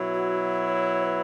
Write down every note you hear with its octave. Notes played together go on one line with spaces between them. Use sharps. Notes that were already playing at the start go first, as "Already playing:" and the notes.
Already playing: B2 F#3 E4
F#4
C#5
C#5
B4